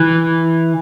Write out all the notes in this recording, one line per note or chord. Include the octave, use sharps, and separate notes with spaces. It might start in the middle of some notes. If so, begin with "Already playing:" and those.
Already playing: E3